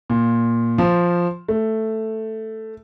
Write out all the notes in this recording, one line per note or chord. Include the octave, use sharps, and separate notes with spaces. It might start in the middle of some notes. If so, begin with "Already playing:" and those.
A#2
F3
A3